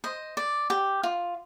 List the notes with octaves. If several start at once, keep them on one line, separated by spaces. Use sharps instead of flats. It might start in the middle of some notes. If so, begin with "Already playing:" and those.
C5 D#5
D5
G4
F4